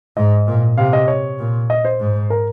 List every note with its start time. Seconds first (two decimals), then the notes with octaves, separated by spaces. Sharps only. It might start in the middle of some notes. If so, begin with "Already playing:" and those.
0.17 G#2 D#5
0.47 A#2
0.78 C3 F5
0.93 D#5
1.08 C#5
1.39 A#2
1.70 D#5
1.85 C5
1.99 G#2
2.30 A#4